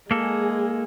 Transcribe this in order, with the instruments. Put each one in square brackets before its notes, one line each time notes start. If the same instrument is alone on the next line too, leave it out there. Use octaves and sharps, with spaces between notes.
[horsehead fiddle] G#3 G#4 [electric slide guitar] A#3 A4